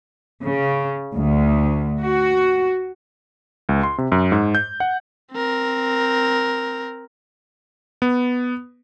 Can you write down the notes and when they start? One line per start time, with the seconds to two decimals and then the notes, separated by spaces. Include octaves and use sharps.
0.45 C#3
1.14 D2
2.02 F#4
3.69 C#2
3.83 C6
3.98 C3
4.12 F#2
4.32 G#2
4.55 G6
4.80 F#5
5.32 C4 A#4
8.02 B3